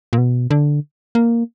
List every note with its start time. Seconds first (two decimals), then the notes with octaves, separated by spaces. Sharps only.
0.13 A#2
0.18 B2
0.51 D3
1.15 A#3